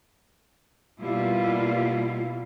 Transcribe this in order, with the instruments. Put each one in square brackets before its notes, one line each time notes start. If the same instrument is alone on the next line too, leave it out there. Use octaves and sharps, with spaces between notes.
[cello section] B2 G3 A#3 E4 F4